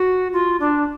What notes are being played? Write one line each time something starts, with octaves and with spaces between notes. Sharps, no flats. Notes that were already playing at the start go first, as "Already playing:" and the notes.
Already playing: F#4
F4
D4